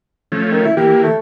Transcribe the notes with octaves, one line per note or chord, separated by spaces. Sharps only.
F3 A3 C#4
D#3
E4
E3 A#3 G4
A3